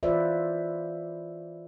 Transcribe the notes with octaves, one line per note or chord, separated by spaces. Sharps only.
E3 F4 B4 C5 D5 E5